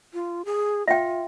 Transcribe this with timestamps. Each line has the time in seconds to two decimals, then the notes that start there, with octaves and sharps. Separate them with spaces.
0.13 F4
0.46 G#4
0.88 F4 E5 G5